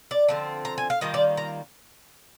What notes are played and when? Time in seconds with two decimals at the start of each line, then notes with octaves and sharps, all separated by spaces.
0.11 D5
0.29 D3 F3 C4
0.65 A#5
0.78 G#5
0.90 F5
1.01 D#3 G3 A#3 F4 D#5
1.14 D5
1.37 A#5